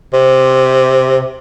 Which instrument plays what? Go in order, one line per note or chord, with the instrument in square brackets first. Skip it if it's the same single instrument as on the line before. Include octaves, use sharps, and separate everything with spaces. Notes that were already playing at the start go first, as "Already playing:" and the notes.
[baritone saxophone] C3